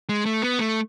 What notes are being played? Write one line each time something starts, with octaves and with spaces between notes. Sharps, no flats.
G#3
A3
B3
A3